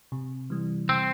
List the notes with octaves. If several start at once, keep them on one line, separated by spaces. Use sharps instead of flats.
C3
E3 G3
C3 C4